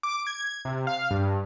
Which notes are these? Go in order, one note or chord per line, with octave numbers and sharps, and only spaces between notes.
D6
G#6
C3
F5
G2